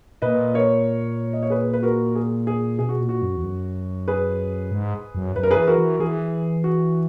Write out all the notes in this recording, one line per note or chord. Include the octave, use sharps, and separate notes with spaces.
A#2 B4 D#5
A#4 C#5
D#5
C#5
G#4 B4
B4
F#4 A#4
G#4
G#4
B2 G#4
F#4
A#2
F#4
F#2
E2
F#2
G#4 B4
G#2
F#2
F#2 B4
A#4
G#4 B4
E3
F#4 A#4
E3
E3 G#4
F#4